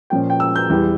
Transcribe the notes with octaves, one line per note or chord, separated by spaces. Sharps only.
A#2 F3 C#4 G5
G5
E6
G6
E2 E3 G3